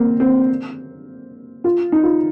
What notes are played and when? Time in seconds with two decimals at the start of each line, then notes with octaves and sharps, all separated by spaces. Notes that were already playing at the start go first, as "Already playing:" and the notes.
Already playing: A#3 C4
0.20 C4
1.64 F4
1.92 D#4
2.03 F4